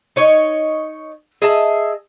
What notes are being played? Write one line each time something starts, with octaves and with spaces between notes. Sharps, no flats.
D#4 C#5 D#5
G#4 D#5 E5 A5